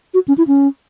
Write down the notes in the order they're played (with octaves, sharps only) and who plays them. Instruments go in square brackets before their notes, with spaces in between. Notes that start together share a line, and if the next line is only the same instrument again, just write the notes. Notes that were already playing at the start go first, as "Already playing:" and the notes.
[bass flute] F#4
C#4
E4
C#4